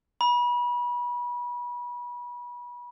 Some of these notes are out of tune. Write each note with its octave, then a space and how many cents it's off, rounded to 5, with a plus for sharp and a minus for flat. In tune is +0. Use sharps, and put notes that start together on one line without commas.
B5 -30